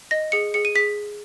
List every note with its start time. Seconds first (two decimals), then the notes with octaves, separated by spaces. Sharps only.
0.11 D#5 A#6
0.32 G#4 C#7
0.54 G#4 C#7
0.65 D#7
0.75 G#4 B6